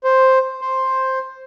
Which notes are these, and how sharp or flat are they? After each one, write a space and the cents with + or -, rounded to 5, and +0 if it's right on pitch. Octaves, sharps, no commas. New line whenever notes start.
C5 +5
C5 +5